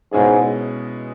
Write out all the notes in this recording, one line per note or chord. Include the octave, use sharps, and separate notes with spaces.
G#2 B2 G#3 C#4 E4 G#4